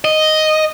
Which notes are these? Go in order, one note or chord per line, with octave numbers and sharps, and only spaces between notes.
D#5